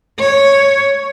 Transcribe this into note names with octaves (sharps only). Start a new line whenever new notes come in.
C#5